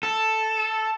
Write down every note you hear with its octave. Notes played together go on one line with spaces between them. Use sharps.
A4